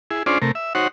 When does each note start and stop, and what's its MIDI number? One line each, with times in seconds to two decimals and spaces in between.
0.11 0.23 64
0.11 0.23 68
0.26 0.38 61
0.26 0.38 62
0.26 0.38 65
0.26 0.38 68
0.26 0.38 72
0.26 0.38 74
0.42 0.51 48
0.42 0.51 57
0.42 0.51 70
0.55 0.73 76
0.75 0.88 63
0.75 0.88 66
0.75 0.88 72
0.75 0.88 73
0.75 0.88 78